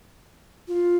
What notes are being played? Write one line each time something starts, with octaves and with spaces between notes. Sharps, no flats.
F4